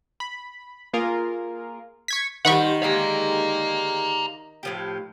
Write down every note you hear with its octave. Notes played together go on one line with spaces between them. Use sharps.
B5
A#3 F4 G#4 A#4
C#6 G#6 B6
D#3 G3 A4 C5 F#5 B5 C#6
D3 G#3 G4 F5 A#5
A2 F3 G4